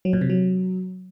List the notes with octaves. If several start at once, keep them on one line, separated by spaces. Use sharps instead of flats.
F#3
A#2
C3
F#3